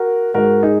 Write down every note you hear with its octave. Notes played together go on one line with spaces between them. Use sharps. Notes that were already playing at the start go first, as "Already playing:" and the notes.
Already playing: F#4 A#4
G#2 G#3 F#4 A#4
D#4 G#4